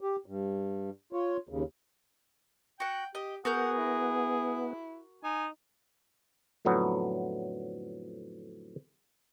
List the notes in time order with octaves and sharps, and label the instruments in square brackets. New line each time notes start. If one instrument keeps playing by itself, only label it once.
[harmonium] G4
G2
F4 C#5
D#2 C#3
[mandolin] F#4 F#5 [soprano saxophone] G5
[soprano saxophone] G4 [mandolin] D#5
[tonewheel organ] B3 [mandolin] F#4 A#4 G6 [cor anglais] G#4 [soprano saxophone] F#5
[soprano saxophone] E4
[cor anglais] D#4 [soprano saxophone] G#5
[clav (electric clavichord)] F2 A2 D3 F#3 B3